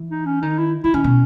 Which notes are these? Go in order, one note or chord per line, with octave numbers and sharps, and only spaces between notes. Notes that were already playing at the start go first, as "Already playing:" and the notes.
Already playing: E3
D#4
C#4
D#3 D#4
E4
D#3 E4
D#3 C#4
B2